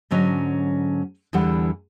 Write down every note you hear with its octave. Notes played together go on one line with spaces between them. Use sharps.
G#2 D3 F#3 C#4 D#5
E2 D3 E3 G3 A4 F#5